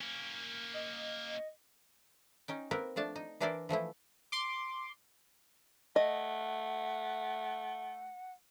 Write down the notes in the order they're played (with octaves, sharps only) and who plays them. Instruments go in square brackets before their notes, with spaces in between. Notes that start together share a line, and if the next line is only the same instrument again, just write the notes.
[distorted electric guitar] A#3 C#4
[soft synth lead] D#5
[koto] C#4 D#4 G5
A#3 C4 A#4 B4
F3 A3 D4 A5
D#4
E3 D4 E4 A#4 C5 D5
E3 F3 A3 E4
[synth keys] C6 D6
[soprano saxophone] A3 [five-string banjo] D#5 [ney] F#5